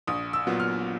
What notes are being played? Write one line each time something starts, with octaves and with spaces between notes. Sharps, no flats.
A#1 D#6
E6
A#2 F#3 B3
F6